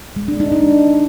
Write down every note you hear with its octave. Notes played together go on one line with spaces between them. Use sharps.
G#3
D4
D#4
D4